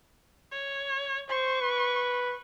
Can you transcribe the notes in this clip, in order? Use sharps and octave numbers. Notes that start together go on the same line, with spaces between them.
C#5
C5 C#6
B4